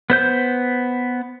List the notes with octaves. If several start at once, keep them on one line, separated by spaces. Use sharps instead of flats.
B3 C5 G6